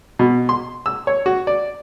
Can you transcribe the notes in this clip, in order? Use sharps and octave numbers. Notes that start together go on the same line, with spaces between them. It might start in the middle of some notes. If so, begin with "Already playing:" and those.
B2
C6
E6
C#5
F#4
D5